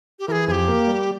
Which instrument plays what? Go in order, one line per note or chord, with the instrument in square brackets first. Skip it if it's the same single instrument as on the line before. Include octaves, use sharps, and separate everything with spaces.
[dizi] G4
[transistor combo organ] E3 [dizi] G#4 A#4
[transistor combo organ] F2 [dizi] G#4
[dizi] G4
[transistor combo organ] A#3
G3